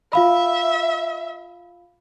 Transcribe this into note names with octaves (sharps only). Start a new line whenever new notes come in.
F4 E5 F5 B5